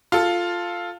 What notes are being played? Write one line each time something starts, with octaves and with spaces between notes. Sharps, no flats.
F4 A4